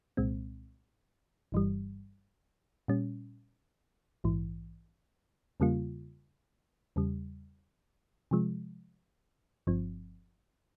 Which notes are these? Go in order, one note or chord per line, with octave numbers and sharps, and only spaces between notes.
C2 A#2 G#3 C4
G1 G2 E3 G3
A#2 G3 C#4
A#1 G#2 E3
E2 C#3 G3 A#3 F4
E2 C#3 G3
C3 F3 G#3
G1 G2 F3 C4